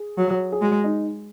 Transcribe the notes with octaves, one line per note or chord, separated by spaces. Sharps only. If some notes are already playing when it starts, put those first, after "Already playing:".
Already playing: G#4
F#3
G#4
G#3 F#4
D#4